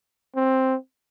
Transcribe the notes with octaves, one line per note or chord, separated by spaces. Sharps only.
C4